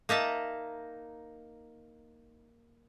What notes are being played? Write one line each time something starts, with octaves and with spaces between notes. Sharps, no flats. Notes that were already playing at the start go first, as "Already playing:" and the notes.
A#3 D#4 E5 A5